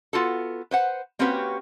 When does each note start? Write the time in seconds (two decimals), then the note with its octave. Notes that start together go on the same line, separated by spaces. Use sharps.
0.13 B3 F4 F#4 A4
0.71 B4 C5 F#5
1.19 A#3 C4 C#4 F#4 G4 B4